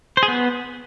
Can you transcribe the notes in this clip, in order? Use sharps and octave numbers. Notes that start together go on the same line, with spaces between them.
C5
G#4
B3